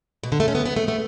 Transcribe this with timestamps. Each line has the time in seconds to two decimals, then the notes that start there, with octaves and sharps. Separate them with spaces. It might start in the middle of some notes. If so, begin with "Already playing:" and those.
0.23 B2
0.32 D3
0.40 A3
0.48 C#4
0.55 B3
0.66 B3
0.76 A3
0.88 A3